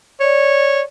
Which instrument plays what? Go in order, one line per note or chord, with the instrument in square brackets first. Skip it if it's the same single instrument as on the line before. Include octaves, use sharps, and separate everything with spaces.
[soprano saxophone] C#5 [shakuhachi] D5